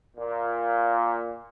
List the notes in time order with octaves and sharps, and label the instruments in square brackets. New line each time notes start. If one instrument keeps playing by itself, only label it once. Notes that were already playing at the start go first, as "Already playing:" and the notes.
[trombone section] A#2